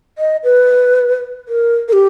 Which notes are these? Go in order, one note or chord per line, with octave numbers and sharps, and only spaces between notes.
D#5
B4
A#4
A#4
G4